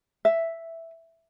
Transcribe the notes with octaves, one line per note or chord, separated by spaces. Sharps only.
E5